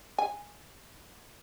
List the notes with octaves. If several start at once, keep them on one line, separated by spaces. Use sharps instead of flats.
G#5